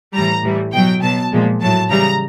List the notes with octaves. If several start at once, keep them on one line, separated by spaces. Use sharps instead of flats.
A2 E3 G3 A#5
A2 E3 G3
B2 F#3 G5
B2 F#3 A5
A#2 F3 G#3
A2 F#3 A5
C#3 E3 G3 A#5